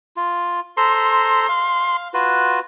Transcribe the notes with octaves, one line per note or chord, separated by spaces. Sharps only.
F4
A4 C5 A#5 C6
F5
F4 F#4 B4